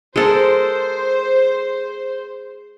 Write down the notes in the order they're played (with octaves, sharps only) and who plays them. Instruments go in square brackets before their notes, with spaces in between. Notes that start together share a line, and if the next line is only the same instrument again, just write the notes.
[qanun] G#3 A4 A#4 [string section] C5